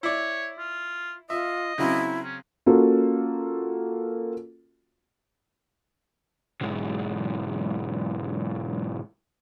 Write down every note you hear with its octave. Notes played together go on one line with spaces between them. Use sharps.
E4 C#5 D5
F4
F4 D#5 E5
C#3 F#3 C4 E4
C#4
A#3 C#4 F4 F#4 A4
B1 G#2